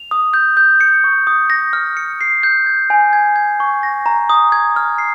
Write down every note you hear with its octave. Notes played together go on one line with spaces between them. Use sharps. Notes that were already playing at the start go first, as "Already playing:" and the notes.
Already playing: F7
D#6
G6
G6
C#7
C#6
D#6
A#6
F6
C#7
C7
G6
G#6
G#5
G#6
G#6
C#6
A#6
A#5
D#6
G#6
F6
C7